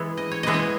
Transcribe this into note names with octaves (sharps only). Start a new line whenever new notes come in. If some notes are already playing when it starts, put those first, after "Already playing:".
Already playing: E3 G#3 B3
D#5
C#5
E3 G#3 B3 D#5
C#5